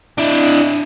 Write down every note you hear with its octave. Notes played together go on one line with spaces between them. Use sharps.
D4 E4